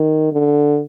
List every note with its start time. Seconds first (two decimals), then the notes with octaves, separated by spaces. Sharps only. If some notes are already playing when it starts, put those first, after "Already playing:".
Already playing: D#3
0.32 D3